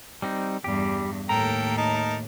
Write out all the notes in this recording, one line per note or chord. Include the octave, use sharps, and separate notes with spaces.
G3 C4 D#4
E2 G2 G3 G4
D#2 A2 A4 A#4 G5 A#5
D#4 A#4 A5